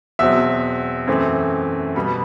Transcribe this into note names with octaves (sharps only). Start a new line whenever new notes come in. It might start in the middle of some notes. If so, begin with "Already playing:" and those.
E2 B2 F#3 C4 E5
F#2 E3 A3 C4
B2 G3 B3 B5